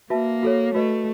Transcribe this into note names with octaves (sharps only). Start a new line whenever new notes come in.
A#3 F#4 B4 E5 A5
F#4 A4 C#5
A3 F#4 B4 D#5